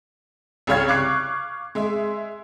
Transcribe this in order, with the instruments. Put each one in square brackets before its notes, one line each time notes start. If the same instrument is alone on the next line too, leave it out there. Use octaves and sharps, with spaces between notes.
[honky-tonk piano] C2 C#3 G3 C#5 F5 G#6
F5 C#6 D6 F#6 C7
G#3 E5